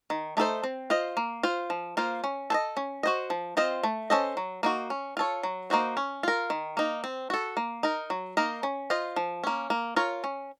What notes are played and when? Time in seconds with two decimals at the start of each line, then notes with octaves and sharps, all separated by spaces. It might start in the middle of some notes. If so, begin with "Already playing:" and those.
0.10 D#3
0.37 A3 D#4 A4 C5
0.64 C4
0.90 F4 C5 D#5
1.17 A#3
1.43 F4 C5
1.70 F3
1.97 A#3 F4 C5
2.24 C#4
2.50 A4 C5 D#5
2.77 C#4
3.03 F#4 C5 D#5
3.30 F3
3.57 C4 F4 C5 D#5
3.83 A3
4.10 C#4 A4 C5 D#5
4.37 F#3
4.63 A#3 D#4 F#4
4.90 C#4
5.17 F4 A4 C#5
5.43 F#3
5.70 A#3 D#4 F#4 C5
5.97 C#4
6.23 F4 A#4
6.50 D#3
6.77 A#3 D#4
7.04 C4
7.30 F#4 A4
7.57 A#3
7.83 D#4 A#4
8.10 F#3
8.37 A#3 D#4 A#4 D#5
8.63 C#4
8.90 F4 C5 D#5
9.16 F3
9.44 A#3 C#4
9.70 A#3
9.96 F4 A#4 C#5
10.24 C#4